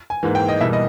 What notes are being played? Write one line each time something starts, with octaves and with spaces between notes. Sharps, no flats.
G#5
G#2 E3 A#3
G5
D#5
E2 B2 G3 A#3 E5
D#5